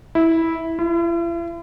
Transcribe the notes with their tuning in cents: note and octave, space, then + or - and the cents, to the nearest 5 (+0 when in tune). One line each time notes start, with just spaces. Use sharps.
E4 -10
E4 +45